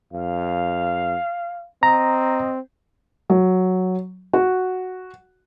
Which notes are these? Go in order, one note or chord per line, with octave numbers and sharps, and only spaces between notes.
F2 F5
C4 D#5 A#5
F#3
F#4